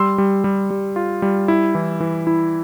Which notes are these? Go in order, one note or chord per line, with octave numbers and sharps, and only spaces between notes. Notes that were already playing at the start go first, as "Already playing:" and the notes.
Already playing: G3 C6 E6
G3
G3
G3
F4
G3
E4
E3
E3
E4